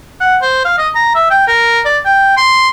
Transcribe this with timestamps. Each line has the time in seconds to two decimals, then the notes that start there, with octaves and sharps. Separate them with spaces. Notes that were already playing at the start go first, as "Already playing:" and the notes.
0.20 F#5
0.42 C5
0.65 F5
0.78 D#5
0.95 A#5
1.15 E5
1.30 G5
1.48 A#4
1.85 D5
2.06 G5
2.37 C6